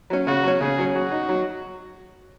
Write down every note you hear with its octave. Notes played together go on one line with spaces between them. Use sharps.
F#3 C#4
C#3 F#4
F#3 C#4
C#3 G#4
F#3 C#4
F#3 F#4
D#4
F#3